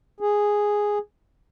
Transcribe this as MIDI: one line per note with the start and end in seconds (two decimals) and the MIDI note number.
0.20 0.99 68